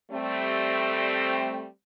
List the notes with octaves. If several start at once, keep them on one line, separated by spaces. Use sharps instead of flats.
G3 A3 C4